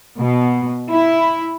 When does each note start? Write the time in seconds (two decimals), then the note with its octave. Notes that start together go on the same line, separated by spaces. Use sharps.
0.20 B2
0.91 E4